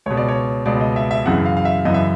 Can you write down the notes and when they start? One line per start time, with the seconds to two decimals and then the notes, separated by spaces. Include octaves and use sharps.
0.06 C#2 B2 C#5
0.17 D5
0.28 C#5
0.66 C#2 B2 D5
0.81 D#5
0.96 E5
1.11 E5
1.26 F#2 C#3 E3 F#5
1.46 F5
1.57 F5
1.65 E5
1.85 F#2 C#3 E3 D#5
1.94 E5